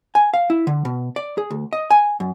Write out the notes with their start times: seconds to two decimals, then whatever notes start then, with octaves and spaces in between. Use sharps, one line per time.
0.15 G#5
0.34 F5
0.50 E4
0.67 D3
0.85 B2
1.16 D5
1.38 G#4
1.51 D2
1.73 D#5
1.91 G#5
2.20 F#2